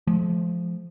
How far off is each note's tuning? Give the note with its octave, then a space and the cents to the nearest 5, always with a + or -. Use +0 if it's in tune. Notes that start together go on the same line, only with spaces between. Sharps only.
F3 -10 G#3 +40